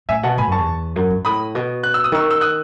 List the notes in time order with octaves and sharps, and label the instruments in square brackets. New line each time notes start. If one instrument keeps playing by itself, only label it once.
[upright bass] A2 [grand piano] E5 G#5
[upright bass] B2 [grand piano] F#5 A5
[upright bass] A2 [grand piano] G#5 B5
[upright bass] F#2 [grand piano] A5 C#6
[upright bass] E2
F#2
G#2
[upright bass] A2 [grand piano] B5 D#6
[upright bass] B2
[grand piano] F#6
E6
D#6
[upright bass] D#3 [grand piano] C#6 E6
[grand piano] E6
D#6 F#6